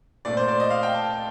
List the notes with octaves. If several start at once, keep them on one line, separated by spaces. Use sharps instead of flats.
A#2 A3 C4 D5
C5
D5
D#5
F5
G5
A5